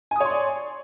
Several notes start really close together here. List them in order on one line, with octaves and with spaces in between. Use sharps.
G#5 D#6 C#5 C6 D5